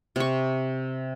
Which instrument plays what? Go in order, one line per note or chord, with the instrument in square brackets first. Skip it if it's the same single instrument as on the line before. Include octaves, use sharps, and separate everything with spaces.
[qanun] C3 C#6